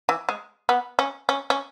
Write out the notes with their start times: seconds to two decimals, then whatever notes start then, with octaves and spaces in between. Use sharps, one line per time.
0.09 E3
0.29 G#3
0.69 B3
0.99 C#4
1.29 C#4
1.50 C#4